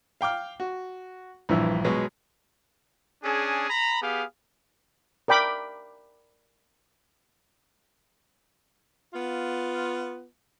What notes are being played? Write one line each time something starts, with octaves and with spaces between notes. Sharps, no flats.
F5 G5 D6 F6
F#4
A#1 G2 E3 E4 E6
B2 F#3 G#3 B3
C#4 D4 G#4
A#5 B5
B3 G4 G#4 F5
A#4 D5 G5 B5 D6
B3 F4